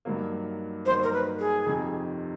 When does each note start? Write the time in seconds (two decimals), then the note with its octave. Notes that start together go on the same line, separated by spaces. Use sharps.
0.05 G2 D#3 F#3 A#3
0.86 G2 D#3 F#3 A#3 C5
1.03 A#4
1.13 B4
1.39 G#4
1.66 F2 C3 D#3